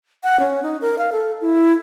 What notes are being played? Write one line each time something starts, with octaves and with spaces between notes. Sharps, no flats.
F#5
C#4
D#4
A#4
F5
A4
E4